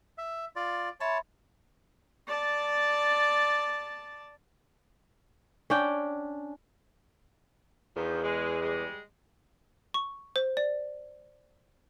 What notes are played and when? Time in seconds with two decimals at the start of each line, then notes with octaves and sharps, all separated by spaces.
0.18 E5
0.56 F4 D5
1.00 C#5 E5 A5 B5 C6
2.28 D5 A5
5.70 C#4 D4 G5
7.96 E2 D#3 F3
8.24 G#3
8.62 G3 G#3
9.94 C#6
10.36 C5
10.57 D5